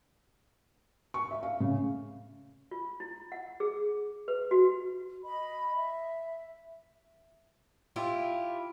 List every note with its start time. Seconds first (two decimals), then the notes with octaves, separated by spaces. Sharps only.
1.14 C#6
1.31 E5
1.43 F5
1.60 C#3
2.71 F4
3.00 E4
3.32 F#5
3.60 G#4
4.28 B4
4.51 F#4
5.24 D#5 B5
5.76 E5
7.96 E4 F4 G4